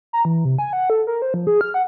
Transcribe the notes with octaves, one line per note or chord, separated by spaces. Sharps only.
A#5
E3
C3
G#5
F#5
A4
A#4
C5
F3
G#4
F6
F#5